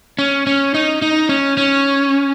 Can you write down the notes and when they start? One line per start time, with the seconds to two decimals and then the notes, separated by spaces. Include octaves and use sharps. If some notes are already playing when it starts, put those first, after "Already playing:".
0.19 C#4
0.47 C#4
0.74 D#4
1.02 D#4
1.29 C#4
1.57 C#4